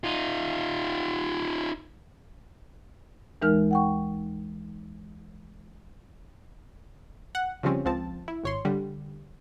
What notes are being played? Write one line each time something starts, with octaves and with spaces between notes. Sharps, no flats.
D#4 F4
D#2 E3 G#3 D#4 A#4 F6
F#5 G5 C#6
F#5
C#3 F3 G3 C4 C#4
C#2 F3 C4 A5
E4
G#1 C#5 C6
D3 G3